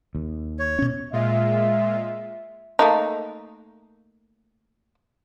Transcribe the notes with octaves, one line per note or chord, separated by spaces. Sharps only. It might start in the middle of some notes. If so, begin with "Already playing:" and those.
D#2
C#5
B2 C#4
A#2 G#3 F4 E5
A3 A#3 D#4